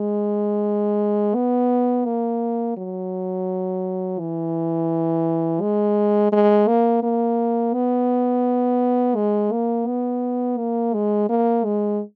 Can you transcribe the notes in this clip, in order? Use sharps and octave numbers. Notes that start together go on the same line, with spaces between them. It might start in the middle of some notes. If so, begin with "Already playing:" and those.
Already playing: G#3
B3
A#3
F#3
E3
G#3
G#3
A#3
A#3
B3
G#3
A#3
B3
A#3
G#3
A#3
G#3